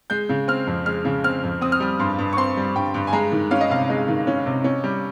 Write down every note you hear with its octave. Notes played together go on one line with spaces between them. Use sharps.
G#3 G6
C#3
C4 F6
F2
G#3 F6
C#3
C4 F6
F2
C4 D#6
F6
G3 D#6
G2 C6
G2
C#6
C4 C6
G3
G2 G5
G2
G#5
G#3 A#5
D#3
C#4 F5
D#5
C3 F5
G#3 D#5
D#3
C#4
C3
C#4
G3